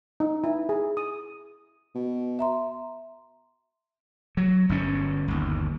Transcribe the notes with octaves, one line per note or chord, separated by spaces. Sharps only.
D#4
E4
G#4
D#6
B2
E5 A#5 C6
F#3
G1 G2 C#4
G1 D#2